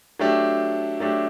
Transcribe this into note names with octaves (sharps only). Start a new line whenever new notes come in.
F#3 A3 D4 G4
F#3 A3 D4 G4